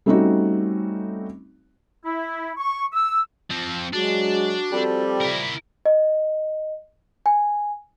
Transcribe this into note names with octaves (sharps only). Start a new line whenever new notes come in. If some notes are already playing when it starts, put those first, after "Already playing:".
G3 A3 C4 C#4 D#4 F#4
E4
C#6
E6
F3 C4
F#3 G#3 D4 F#4
F3 G3 C4 G4 A4
E4 A#4
D#5
G#5